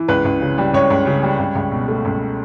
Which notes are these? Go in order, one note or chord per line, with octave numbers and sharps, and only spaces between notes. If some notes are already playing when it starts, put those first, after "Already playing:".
Already playing: E3
C#2 B4
C#2
C#3
G3
C#2 C#5
C#2
C#3
G3
C#2
C#2
B2
A3
C#2